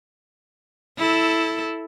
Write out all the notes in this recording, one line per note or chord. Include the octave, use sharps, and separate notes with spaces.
E4 A4